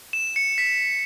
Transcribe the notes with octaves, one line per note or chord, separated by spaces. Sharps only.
E7
C#7
B6